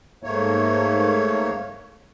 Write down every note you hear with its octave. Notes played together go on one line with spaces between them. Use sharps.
G#2 A3 A#3 C#5